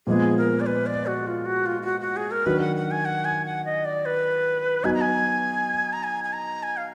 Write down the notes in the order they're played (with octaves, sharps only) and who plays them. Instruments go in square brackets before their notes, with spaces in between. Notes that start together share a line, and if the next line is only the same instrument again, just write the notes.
[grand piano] A#2 F3 G#3 B3 [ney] G#4
[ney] A#4
D5
B4
D5
F#4
F4
F#4
F4
F4
F#4
F#4
G#4
A#4
[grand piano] D#3 F#3 D4 F#4 [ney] B4
[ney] F#5
F#5
G#5
F#5
G#5
F#5
D#5
D5
B4
[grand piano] F#3 B3 D#4 F#4 [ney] G#5
[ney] A#5
G#5
A#5
G#5
G#5
A#5
G#5
F5